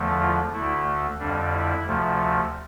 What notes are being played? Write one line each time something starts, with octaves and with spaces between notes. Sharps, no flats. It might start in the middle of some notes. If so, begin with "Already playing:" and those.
Already playing: E2 D3 F3 A3
F4
D2 D3 A3 E4
F2 D3 G3 D4
E4
D2 C3 F3 A3